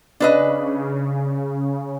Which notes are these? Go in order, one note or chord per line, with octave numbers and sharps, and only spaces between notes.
C#3 D4 B4 D#5